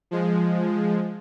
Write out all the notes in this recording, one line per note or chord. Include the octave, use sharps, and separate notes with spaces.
F3 G#3